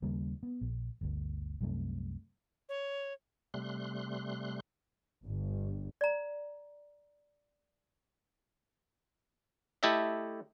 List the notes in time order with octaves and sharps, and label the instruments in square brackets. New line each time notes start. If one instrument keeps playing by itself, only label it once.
[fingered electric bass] D#2 C#3 G3 A#3
B3
A#1
G1 D2
C2 F#2 C3 A3
[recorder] C#5
[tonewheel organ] C3 G3 A3 C6 F#6
[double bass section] G1
[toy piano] D5 A#5
[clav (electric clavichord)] A3 E4 G4 A4 D#5 E5